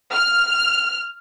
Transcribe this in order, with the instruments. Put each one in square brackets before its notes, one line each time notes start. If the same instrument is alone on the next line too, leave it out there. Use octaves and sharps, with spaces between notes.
[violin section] F6